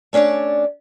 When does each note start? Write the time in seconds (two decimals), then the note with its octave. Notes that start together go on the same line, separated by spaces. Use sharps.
0.13 A3 C#4 D4 C#5 D5